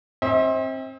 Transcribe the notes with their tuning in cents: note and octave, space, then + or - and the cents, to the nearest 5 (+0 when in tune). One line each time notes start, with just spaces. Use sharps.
C4 +25 E5 -45